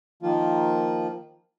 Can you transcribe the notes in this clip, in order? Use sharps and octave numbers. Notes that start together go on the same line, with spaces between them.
D#3 F3 A#3 F4